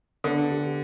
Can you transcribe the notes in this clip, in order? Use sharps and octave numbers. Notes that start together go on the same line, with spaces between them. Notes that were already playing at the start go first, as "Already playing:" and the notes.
D3 B3
G4